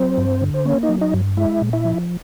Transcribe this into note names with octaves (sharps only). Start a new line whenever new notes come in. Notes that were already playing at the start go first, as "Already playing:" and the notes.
Already playing: F#3 C4 C5
G2
D3
C5
A#3 C#4 C#5
D#4 D#5
F#3
D#4 D#5
G2
G#3 E4 E5
A#2
E4 E5
F3